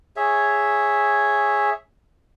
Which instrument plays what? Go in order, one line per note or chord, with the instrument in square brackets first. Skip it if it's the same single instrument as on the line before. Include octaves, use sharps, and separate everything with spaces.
[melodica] G#4 C#5 E5